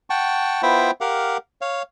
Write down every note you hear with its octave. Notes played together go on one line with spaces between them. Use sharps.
F#5 G5 A5 C#6
B3 E4 F4 C5 E5 G5
G4 A#4 F5 F#5
C#5 F5